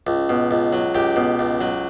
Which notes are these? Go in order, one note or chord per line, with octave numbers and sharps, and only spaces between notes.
C#2
B2
C#2
F#3
C#2 G4
B2
C#2
F#3